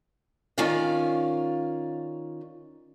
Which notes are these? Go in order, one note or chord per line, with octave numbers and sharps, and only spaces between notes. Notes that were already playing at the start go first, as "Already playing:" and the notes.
D#3 C#4 F4 D5 F5